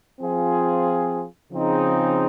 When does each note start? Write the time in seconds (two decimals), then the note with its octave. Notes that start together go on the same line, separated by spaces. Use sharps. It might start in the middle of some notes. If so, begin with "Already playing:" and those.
0.21 F3 C4 F4 G#4
1.51 C#3 F3 C4 D#4 G#4